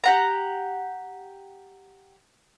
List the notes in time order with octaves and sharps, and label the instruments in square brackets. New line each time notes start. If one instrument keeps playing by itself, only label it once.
[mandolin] G4 F#5 A#5